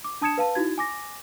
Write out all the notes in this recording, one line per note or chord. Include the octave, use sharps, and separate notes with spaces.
D6
D4 A5 D#6 G#6 C#7 E7
B4 F5 A5
D#4 E4 F#4 G#6
G#5 D6 A#6